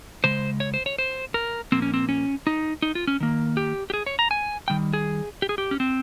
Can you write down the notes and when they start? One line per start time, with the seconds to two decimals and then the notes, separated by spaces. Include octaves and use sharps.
0.24 C#3 G#3 C5
0.60 C#5
0.74 C5
0.86 C#5
0.99 C5
1.34 A#4
1.72 A#2 F3 A#3 C4
1.82 C#4
1.94 C4
2.09 C#4
2.47 D#4
2.82 D#4
2.95 F4
3.07 C#4
3.20 D#3 A#3
3.57 G4
3.90 G4
3.94 G#4
4.06 C#5
4.19 A#5
4.31 G#5
4.68 D#3 G3 G5
4.93 G#4
5.42 G4
5.49 G#4
5.58 G4
5.71 C#4
5.80 C4